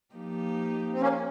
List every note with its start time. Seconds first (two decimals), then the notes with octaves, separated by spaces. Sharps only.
0.13 F3 A#3 D#4 G4
0.93 C4
1.01 A#3 C#4